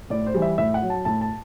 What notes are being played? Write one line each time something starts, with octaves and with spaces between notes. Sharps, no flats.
A2 D5
C5
E3 G3
E5
A2 E5
F#5
F#3
A5
A2 A5
A5